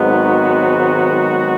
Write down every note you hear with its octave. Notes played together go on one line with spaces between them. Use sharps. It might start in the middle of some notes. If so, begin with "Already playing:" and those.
Already playing: G#1 G#2 D#3 F#3 B3
F#4